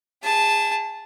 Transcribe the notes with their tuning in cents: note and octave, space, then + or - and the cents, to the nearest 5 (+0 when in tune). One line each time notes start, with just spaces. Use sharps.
G#4 -30 A5 -5